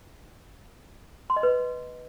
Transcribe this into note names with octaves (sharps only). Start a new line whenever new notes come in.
C6
D#5
B4